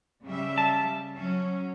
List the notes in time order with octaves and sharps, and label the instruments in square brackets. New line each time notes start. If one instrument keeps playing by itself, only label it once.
[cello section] C#3 G3 E5
[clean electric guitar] A5
[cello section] F#3 C#4